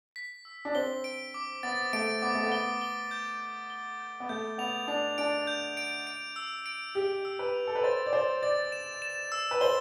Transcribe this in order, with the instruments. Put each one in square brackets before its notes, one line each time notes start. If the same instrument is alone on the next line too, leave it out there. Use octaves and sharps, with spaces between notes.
[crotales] B6
E6
[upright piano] D4
[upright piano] C4 [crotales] G7
[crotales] D7
D6
[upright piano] B3 [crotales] A6
[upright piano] A3 [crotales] D7
[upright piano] B3 [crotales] D6
[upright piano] A3
B3
[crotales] G7
G7
G6
G6
G7
G6
[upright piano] B3
[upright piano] A3 [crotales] G6
[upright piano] B3 [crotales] F7
[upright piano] D4 [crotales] F7
[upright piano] D4 [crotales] D7
[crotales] G6
D7
D7
E6
D7
[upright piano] G4 [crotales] E6
[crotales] E6
[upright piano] B4
[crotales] F7
[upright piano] A4
B4
[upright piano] C5 [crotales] A6
[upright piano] D5
[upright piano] C5 [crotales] E6
[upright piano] D5 [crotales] A6
[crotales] E7
E7
E6
[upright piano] B4
[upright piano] C5 [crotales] G7